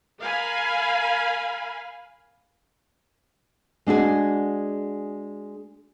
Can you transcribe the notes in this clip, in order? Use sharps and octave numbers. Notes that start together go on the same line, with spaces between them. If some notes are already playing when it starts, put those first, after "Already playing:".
A#4 F5 G#5 B5
G#3 D4 F#4 G#4